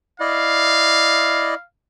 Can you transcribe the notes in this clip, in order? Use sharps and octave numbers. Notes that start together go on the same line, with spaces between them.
E4 D5 D#5 F5